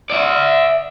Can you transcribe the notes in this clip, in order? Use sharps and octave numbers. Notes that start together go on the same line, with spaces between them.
D5 E5